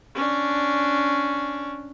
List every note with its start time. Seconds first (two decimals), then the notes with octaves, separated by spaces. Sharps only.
0.15 C#4 D4